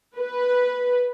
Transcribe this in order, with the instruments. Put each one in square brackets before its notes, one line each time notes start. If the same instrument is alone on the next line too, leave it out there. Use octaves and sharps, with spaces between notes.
[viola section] B4